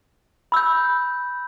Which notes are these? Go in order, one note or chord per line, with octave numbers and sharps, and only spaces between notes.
B5 E6 G6